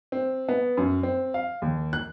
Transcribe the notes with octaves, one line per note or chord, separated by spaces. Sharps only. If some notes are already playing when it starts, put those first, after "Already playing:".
C4
B3
F#2
C4
F5
D#2
F#6